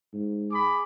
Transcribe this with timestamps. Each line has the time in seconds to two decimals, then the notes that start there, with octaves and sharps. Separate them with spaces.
0.13 G#2
0.52 G#4 B5 D6